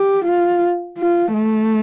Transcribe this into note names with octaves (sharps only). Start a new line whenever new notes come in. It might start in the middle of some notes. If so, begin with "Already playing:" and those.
Already playing: G4
F4
F4
A3